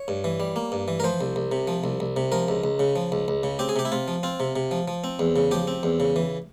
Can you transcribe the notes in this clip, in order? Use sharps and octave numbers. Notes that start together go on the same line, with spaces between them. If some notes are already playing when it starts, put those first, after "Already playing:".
Already playing: C#5
G2
E3
G3
A#3
G2
E3
A#4
F3 C5
C2
C2
C3
F3
C2
C2
C3
F3 A#4
C#2
C#2
C#3
F3
C#2
C#2
C#3
C4 G4
G#4
C3 G4
E4
C3 F4
F3
C4 F4
C3
C3
F3
F3
C4
E2
C#3
F3 G4
C4
E2
C#3
E3